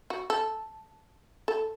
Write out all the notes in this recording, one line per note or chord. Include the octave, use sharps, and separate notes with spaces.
F#4
A4
A4